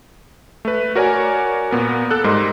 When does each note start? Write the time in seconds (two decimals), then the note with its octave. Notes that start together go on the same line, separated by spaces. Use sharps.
0.65 A3 B4
0.95 F#4 A#4 C#5 D5 G#5
1.71 A#2 B3 A#4
2.11 A4 F#6
2.24 G#2 G3 A#4 D#5 C6